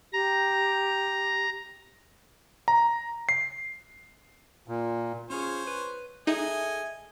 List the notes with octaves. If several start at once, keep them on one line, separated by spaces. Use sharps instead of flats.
G4 A#5
A#5
C7
A#2
C#4 F4 G#4 C5 C#5
B4
D#4 G#4 A4 D#5 E5 G#5